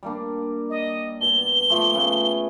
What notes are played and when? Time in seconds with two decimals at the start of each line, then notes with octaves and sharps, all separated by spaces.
0.03 G3 A#3 D4
0.70 D#5
1.21 B2 G7
1.70 F3 A3 G4
1.93 C#3 A3 B3